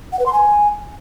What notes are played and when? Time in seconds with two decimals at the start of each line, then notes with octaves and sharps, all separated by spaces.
0.12 F#5
0.19 B4
0.26 C6
0.33 G#5